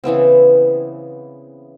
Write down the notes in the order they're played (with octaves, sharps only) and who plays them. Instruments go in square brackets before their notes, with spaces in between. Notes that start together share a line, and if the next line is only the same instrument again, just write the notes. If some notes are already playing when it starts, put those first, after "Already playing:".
[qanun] C#3 E3 B3 C4